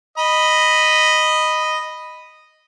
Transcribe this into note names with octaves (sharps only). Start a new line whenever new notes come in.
D#5 B5